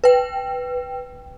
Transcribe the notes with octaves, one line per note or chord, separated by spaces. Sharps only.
B4 G5